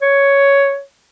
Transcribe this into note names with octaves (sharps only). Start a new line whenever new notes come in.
C#5